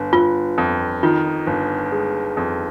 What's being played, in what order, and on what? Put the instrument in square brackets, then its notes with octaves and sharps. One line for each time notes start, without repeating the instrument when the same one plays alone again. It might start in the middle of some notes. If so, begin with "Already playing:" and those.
Already playing: [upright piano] G1
[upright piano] G1 [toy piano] F4
[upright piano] F2
[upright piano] D#3 [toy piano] F4
[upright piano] G1
G#3
F2